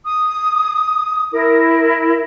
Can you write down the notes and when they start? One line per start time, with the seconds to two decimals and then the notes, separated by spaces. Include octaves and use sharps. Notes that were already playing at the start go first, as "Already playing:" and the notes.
0.05 D#6
1.32 E4 A#4